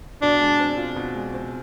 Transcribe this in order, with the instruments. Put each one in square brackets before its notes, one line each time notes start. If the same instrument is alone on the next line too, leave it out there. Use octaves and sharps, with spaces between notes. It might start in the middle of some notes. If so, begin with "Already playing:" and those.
[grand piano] B2 [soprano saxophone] D4
[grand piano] G#3
C4
F4
B2
G#3
C4